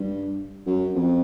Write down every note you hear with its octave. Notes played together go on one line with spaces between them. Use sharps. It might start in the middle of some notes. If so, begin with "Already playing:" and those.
Already playing: G2
F#2
F2